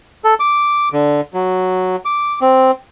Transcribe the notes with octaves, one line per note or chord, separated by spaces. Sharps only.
A4
D6
D3
F#3
D6
C4